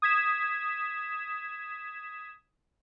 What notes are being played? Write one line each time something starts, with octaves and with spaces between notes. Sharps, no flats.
D#6 G#6 B6 E7